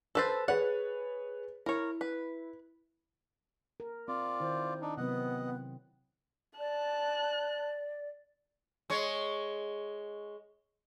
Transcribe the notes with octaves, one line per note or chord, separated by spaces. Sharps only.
A4 B4 C5 E6 A6
G#4 B4 C#5 F#5
E4 A#4 C#5
B4
A#4
C4 F4 D5
D#3 E4 C5
D4 D#4
C3 F#3 B3 C4 D#5 F#5
D5 A5 F#6
G#3 C#5